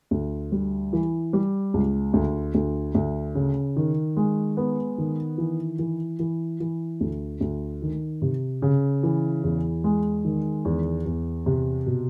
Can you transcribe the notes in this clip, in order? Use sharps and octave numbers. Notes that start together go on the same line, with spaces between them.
D2
G3
E3
G3
C#2
D2
D2
D2
C#3
D#3
G#3
B3
D#3
E3
E3
E3
E3
D2
D2
D#3
C3
C#3
E3
E2
G#3
D#3
E2
E2
C3
B2